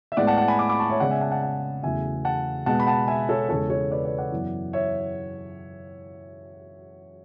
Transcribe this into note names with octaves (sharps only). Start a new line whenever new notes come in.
E5
A2 G#3 B3 D5 F#5
F#5 A5
F#5 A5
G#5 B5
B5 D6
B5 D6
A5 C#6
C#5 E5
C#3 G#3 B3 D5 F#5
E5 G#5
F#5 A5
F#5 A5
F#5 A5
E2 C#3 F#3 A3 E5 G#5
F#5 A5
B2 G#3 B3 F#5 A5
B5
F#5 A5
E5 G#5
A4 C#5
E2 C#3 G#3 A4 C#5
A4 C#5
B4 D5
B4 D5
D5 F#5
F#2 E3 B3
C#5 E5